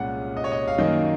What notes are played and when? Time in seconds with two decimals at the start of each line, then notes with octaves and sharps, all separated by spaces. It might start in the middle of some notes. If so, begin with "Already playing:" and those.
Already playing: C2 A#2 G#3 C#4 F#5
0.37 D#5
0.44 C#5
0.52 D#5
0.68 F5
0.78 F#2 D#3 A#3 D#5